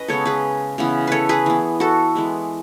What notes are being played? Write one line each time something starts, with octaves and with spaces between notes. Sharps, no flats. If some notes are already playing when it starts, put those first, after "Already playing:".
Already playing: C#4 B4 D#5
C#3 G#3 B3 A4 C#5
G#4 B4
C#3 E3 B3
A4 B4 C#5
G#4 B4
E3 B3
F#4 A4
E3 G#3 B3